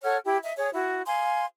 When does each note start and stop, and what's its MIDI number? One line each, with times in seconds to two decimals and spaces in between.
0.03 0.17 69
0.03 0.17 73
0.03 0.17 78
0.03 0.17 89
0.24 0.38 64
0.24 0.38 67
0.43 0.53 75
0.43 0.53 76
0.57 0.70 68
0.57 0.70 73
0.74 1.01 64
0.74 1.01 66
1.06 1.45 77
1.06 1.45 80
1.06 1.45 84